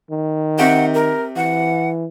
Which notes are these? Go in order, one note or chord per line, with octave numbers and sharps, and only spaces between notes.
D#3
C3 G4 F#5
A#4
E3 F#5